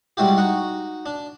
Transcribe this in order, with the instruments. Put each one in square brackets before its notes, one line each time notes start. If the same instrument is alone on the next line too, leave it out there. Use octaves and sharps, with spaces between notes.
[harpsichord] G3 G#3 E4 F#4 G4
D#4 F#4 F#5
D4